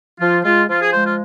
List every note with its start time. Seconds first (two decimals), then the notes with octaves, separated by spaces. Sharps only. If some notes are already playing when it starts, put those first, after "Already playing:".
0.20 F3 F4
0.44 G#3 F4
0.68 F3 F4
0.81 G#4
0.93 G#3 C5
1.06 F4